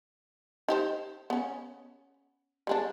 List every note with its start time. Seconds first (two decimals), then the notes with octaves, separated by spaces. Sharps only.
0.68 D#4 G4 C5
1.30 B3 C#4
2.67 G3 G#3 D4